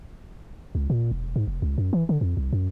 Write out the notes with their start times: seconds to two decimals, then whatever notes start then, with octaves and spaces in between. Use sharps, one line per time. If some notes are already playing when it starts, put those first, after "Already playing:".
0.75 C#2
0.90 A#2
1.12 E1
1.36 G#2
1.47 F1
1.62 C#2
1.78 F#2
1.93 E3
2.09 D3
2.21 F2
2.37 C2
2.53 F#2